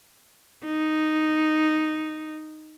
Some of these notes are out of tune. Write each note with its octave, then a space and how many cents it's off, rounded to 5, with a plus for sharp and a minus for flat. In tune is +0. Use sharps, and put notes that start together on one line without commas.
D#4 -5